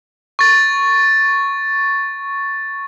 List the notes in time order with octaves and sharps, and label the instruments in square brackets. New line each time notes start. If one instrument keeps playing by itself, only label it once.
[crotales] C#6 A6